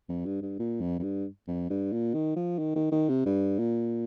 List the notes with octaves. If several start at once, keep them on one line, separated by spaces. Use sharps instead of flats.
F2
G2
G2
A#2
F2
F2
G2
F2
G2
A#2
D#3
F3
D#3
D#3
D#3
C3
G2
A#2